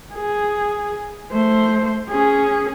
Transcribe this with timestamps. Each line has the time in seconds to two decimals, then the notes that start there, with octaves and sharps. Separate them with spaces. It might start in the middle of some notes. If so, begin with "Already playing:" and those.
0.15 G#4
1.31 A3 C5
2.09 C#4 G#4